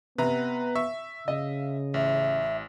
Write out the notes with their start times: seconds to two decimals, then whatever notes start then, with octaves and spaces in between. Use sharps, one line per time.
0.18 C3 B3 B4 A#5
0.75 E5 C#6
1.28 C#3 D#5 F5
1.94 A1 E5